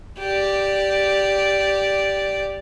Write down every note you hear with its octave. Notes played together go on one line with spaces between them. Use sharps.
G4 D5